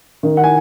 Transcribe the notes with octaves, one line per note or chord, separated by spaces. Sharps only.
D#3
F#5
G#5